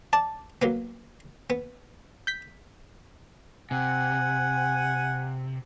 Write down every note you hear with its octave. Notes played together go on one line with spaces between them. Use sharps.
D5 A5
F#3 A#3 B3
B3
G6 B6
C3 F#5 G#5